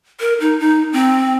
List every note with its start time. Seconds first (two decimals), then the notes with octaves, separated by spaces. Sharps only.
0.20 A#4
0.40 D#4
0.60 D#4
0.93 C4